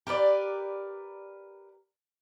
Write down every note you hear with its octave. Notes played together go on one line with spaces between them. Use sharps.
G4 A#4 B4 D5